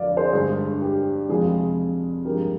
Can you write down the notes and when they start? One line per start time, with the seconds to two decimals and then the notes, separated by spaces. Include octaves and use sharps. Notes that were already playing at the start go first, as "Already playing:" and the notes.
Already playing: F2 D3 D5 F5
0.17 G#4 C5
0.33 G2 D3 G#3 G#4
0.81 G4
1.29 F2 C3 F3 G#3 G#4
2.25 G2 F3 G#3 G4 A#4